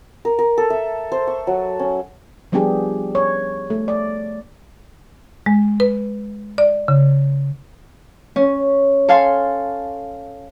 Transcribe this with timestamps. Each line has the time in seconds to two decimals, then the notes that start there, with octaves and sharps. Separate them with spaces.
0.25 A#4
0.39 A#4
0.58 A4
0.70 E5
1.12 C5
1.27 C#6
1.47 F#3
1.79 C#4
2.52 F3 G3 B3 D4 G4 G#4
3.15 C#5
3.70 A3
3.88 D5
5.46 G#3
5.80 B4
6.58 D5
6.88 C#3
8.36 C#4
9.08 A4 F5 G#5 C6